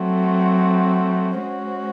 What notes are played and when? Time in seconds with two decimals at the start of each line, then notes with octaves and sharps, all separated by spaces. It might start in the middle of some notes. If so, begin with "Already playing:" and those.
Already playing: F#3 A3 C4 F#4
1.40 G#3 C#4 F#4 C5